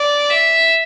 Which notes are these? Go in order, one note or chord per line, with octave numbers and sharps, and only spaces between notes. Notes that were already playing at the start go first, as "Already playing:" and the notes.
Already playing: D5
E5